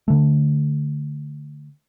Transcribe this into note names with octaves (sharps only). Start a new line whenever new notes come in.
D3 A3